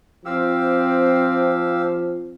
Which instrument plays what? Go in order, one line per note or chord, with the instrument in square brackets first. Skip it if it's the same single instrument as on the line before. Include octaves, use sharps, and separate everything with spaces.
[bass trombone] F3 [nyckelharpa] C4 [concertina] G4 F5 E6